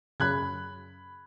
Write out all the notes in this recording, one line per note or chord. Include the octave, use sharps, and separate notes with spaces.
F#2 C#3 B5 F#6 G#6